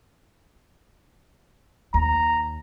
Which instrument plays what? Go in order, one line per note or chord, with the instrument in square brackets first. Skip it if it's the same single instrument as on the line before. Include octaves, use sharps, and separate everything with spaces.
[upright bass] D#2 [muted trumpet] A#5